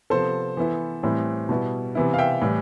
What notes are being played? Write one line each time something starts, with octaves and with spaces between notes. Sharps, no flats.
C3 F3 B3 A4 C5
E3 B3 E4
A2 E3 G3 C4 E4
B2 G3 B3 E4
C3 E3 B3 E4
F5
E5 G5
A2 E3 G3